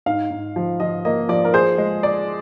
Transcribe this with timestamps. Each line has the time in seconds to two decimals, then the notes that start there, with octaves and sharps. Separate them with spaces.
0.06 G#2 F5
0.31 G#2
0.56 F3
0.80 F3 D#5
1.05 A#3 D#5
1.29 F3 D5
1.45 A#4
1.54 G#4 C5
1.78 G#3
2.03 D5